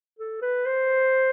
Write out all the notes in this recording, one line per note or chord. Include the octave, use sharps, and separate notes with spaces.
A4
B4
C5